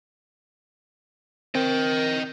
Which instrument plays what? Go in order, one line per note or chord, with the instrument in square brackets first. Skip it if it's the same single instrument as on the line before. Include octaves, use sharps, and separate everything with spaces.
[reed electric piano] C4 [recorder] A#4 [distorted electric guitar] D#5 G5